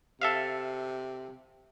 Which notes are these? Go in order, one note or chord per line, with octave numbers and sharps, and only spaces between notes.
C3 A4 E5 F5